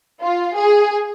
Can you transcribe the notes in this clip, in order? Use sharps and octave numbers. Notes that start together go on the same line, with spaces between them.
F4
G#4